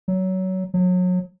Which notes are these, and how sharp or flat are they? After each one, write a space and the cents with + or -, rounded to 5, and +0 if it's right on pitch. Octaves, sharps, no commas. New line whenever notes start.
F#3 +20
F#3 -30